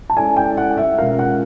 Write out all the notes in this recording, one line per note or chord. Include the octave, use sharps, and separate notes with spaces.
A5
G#3 C#4 E4 A4 D5 G#5
G5
F#5
E5
B2 G#3 C#4 F4 A#4 F5
F#5